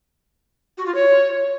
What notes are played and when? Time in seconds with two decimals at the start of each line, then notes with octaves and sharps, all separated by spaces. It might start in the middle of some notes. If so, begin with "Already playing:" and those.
0.78 F#4
0.86 F4
0.95 C#5